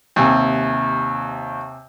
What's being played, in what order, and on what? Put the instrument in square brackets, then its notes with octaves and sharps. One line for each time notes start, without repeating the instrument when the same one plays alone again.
[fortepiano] D#2 [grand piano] C3 G#5